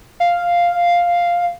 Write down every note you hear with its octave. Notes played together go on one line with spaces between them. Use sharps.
F5